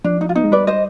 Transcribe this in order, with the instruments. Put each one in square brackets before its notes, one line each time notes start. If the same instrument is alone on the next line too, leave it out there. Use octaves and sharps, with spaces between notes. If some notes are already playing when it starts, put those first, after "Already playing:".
[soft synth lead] F3 [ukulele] D4
[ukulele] D#4
F4
[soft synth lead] B3 [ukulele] D#4
[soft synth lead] G#3
[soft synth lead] G3 [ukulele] B4 D5
[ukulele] C5 D#5